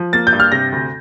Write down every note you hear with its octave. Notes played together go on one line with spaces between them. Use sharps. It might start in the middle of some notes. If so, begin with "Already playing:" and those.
Already playing: F3
A#3 A6
G6
G2
F6
C3 A#6
D2